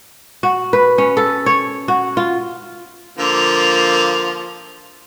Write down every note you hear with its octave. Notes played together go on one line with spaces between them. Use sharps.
F#4
B4
C#4
A4
C#5
F#4
F4
D3 F3 A#3